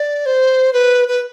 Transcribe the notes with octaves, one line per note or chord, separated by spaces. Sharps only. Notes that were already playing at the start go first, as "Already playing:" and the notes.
Already playing: D5
C5
B4
B4